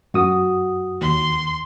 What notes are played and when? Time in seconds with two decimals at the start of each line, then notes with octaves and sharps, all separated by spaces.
0.14 F#2 F#4 D#6
1.01 D#2 C6